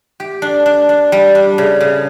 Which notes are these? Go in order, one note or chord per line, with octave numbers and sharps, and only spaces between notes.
G4
D4
D4
D4
G3
D4
C#3
C#3